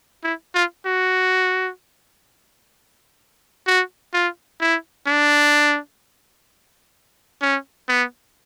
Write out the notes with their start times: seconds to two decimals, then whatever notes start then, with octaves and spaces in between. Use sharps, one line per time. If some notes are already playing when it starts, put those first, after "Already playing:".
0.24 E4
0.54 F4
0.86 F#4
3.66 F#4
4.13 F4
4.61 E4
5.07 D4
7.42 C#4
7.89 B3